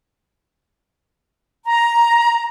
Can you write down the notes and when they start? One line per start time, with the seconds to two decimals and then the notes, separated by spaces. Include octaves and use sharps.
1.65 A#5